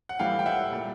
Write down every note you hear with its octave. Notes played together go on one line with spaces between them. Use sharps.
F#5
A2 E3 G3 F5 G5
G5
E5 F#5
A#2 G3